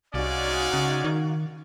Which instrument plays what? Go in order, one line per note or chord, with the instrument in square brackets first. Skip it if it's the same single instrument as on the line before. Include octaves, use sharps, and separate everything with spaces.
[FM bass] C2 [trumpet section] G#3 C#4 D5 [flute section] D#4 F#4 F5
[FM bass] C#3
D#3